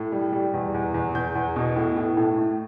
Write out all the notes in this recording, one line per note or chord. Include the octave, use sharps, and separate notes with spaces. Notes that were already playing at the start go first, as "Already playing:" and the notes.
Already playing: A2
G3
G3
E2
E2
E2
E2 G6
E2
B2
A2
A2
A2
A3